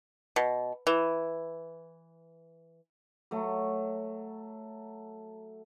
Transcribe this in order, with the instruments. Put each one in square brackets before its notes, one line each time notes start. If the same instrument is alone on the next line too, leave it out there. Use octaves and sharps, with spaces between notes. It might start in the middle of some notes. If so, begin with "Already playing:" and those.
[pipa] B2
E3
[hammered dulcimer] F#3 A3